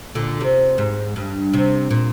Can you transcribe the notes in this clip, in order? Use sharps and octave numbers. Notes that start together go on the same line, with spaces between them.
A#2 D3
C3
G#2
G2
C3
A#2